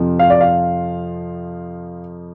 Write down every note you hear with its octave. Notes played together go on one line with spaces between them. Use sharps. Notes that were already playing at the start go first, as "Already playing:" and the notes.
Already playing: F2 C3 F3
F5
D5
F5